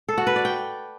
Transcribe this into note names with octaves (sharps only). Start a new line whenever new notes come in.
A4
F#4
B4
D5
G5